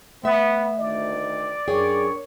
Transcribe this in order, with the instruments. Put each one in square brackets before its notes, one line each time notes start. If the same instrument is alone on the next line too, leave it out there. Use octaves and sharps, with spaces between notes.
[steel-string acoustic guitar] A3 E5 [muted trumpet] B3
[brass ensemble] D2 D#3 [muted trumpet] D5
[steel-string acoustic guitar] F#2 G#4 G5 [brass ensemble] D4 A#4 C#5